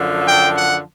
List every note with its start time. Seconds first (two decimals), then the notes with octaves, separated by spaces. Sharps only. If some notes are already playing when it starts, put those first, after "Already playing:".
Already playing: F#2 D3 F3
0.26 G5
0.56 F#5